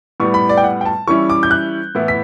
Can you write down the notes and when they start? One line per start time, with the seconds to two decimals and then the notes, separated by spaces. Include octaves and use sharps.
0.20 A2 G3 B3 C#6
0.34 B5
0.49 D5
0.57 G5
0.64 F#5
0.81 G5
0.86 A5
1.07 E3 G3 C#4 E4 C#6
1.30 D6
1.43 G6
1.51 F#6
1.95 A2 E3 B3 E4
2.08 B6